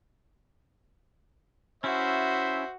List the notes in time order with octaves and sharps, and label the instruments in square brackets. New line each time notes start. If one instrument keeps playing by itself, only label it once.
[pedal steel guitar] C#4 E4 [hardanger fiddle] F#4 [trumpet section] C5 E5